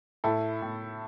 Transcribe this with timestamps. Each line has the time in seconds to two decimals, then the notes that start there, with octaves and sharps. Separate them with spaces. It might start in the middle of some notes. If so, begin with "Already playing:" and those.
0.24 A2 E4 A4
0.62 A2